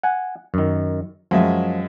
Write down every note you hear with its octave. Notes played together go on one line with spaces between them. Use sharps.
F#5 G#5
F#2 D#3
F#2 F3 G#3 E5